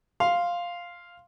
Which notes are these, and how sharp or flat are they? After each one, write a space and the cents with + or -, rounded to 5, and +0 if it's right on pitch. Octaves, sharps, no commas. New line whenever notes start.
F5 +0 C6 +0